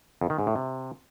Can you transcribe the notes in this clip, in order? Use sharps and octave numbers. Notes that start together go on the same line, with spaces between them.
F2
D#3
G#2
A2
C3